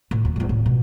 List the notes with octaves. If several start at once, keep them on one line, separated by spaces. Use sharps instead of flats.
A2
D#2
E2 G3
A2
B2